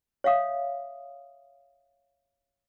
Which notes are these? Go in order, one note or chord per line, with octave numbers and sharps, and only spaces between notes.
C#5 E5 F5 D#6